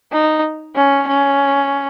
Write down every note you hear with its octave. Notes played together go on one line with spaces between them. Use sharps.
D#4
C#4
C#4